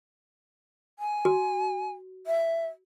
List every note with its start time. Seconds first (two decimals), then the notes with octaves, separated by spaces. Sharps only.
0.99 G#5
1.25 F#4
2.27 E5